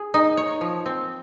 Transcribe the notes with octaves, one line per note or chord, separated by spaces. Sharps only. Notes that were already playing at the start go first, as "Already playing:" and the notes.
Already playing: G#4
D#4
C#5
F3
C4